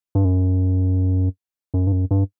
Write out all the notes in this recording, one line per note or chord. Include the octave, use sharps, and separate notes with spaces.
G2
F#2
F#2
G2
F#2
G2